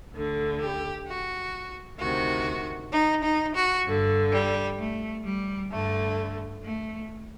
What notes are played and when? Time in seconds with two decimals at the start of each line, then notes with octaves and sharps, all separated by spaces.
0.13 D2 D3
0.60 G4
1.07 F#4
1.99 D2 C3 D#3 F#4
2.92 D#4
3.23 D#4
3.55 F#4
3.84 G2 D3
4.31 G3
4.78 A3
5.24 G3
5.70 G2 D3 A3
6.64 A3